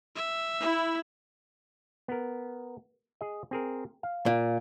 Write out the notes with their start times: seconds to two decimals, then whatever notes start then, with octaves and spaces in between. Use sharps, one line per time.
0.16 E5
0.62 E4
2.08 B3 A#4
3.21 G#4 D#5
3.51 C4 G#4 A#4
4.03 F5
4.26 A#2